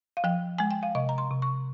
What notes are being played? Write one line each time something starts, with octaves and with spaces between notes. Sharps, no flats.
F5
F3 G5
G#3 G#5
G5
F5
C3 D#5
A#5
C6
C3
C#6